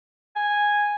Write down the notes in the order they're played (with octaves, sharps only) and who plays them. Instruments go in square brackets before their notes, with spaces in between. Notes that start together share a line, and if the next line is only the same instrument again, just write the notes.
[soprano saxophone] G#5